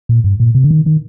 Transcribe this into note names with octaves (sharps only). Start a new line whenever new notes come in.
A#2
G2
A#2
C3
D3
D#3
D#3